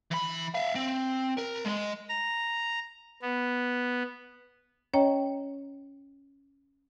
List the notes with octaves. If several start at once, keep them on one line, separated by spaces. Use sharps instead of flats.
E3 B5
E5 F5
C4
A#4
G#3 D#5
A#5
B3
C#4 C#5 D#5 G5 A#5